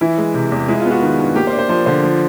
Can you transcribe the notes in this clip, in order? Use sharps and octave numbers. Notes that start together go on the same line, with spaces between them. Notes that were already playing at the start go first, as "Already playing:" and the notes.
E3 E4
G#3
C3
E2
G#3 E4
F4
B3
F#4
D#3
G2
A#3 G4
C5
D4
C5
F3 C5
D3 C5
F3